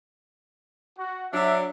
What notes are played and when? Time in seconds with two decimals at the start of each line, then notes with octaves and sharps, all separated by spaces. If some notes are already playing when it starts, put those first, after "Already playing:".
0.99 F#4
1.33 F#3 D4 E5